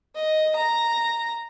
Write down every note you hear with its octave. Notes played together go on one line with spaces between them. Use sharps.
D#5
A#5